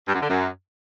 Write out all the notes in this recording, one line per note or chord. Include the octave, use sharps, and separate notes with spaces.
G2
F#2
D3
F#2